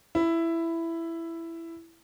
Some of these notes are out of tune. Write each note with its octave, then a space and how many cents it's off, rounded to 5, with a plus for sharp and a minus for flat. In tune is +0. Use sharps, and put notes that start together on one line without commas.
E4 +10